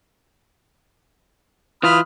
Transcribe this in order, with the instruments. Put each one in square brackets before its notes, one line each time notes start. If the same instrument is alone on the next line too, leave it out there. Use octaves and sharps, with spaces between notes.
[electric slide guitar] E3 F4 [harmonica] B5 D#6 F6